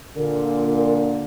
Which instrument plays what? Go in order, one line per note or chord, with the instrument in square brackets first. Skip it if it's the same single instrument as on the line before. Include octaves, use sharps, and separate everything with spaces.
[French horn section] A#2 D3 [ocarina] A#4